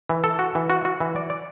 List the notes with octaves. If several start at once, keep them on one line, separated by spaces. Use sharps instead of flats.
E3
A4
F#4
E3
F#4
F#4
E3
D5
D5